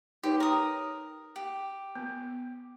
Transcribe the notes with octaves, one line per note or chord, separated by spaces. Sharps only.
D#4 G4 B4 C#5
A#4 D#6
G4
B3